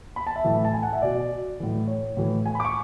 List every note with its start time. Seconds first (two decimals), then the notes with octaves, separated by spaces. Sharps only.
0.16 B5
0.27 A5
0.36 E5
0.44 A2 E3
0.65 A5
0.74 G#5
0.83 F#5
0.93 E5
1.02 B2 D5
1.60 A2 E3
1.87 C#5
2.17 A2 E3
2.46 G#5
2.55 B5
2.60 D6
2.65 C#6